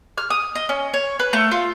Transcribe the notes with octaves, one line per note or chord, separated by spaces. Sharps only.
F6
D#6
D#5
C#4
C#5
B4
A3
F4